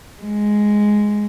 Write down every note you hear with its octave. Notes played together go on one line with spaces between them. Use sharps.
G#3